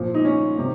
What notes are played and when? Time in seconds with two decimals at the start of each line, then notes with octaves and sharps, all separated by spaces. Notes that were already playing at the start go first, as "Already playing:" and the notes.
Already playing: A#2 F3
0.14 D#4
0.25 C#4
0.57 C3 D#3